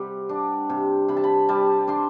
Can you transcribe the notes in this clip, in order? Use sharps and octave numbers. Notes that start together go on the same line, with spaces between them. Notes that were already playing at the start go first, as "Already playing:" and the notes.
Already playing: C3 G3 F#5
D4
C3
C3 B5
A5
B5
G3 A5
D4 C6